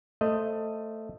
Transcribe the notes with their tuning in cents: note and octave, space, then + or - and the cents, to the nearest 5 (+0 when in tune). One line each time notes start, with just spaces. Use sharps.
A3 +10 C5 +10 D#5 +0